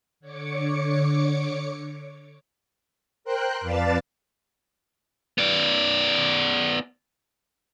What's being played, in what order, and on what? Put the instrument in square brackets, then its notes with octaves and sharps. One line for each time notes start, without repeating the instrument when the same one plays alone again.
[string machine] D3 C#5 D6 C#7
A#4 C5 G5 F#6
F2 B4 D5 F5 A5 A6
[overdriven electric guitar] B3 D5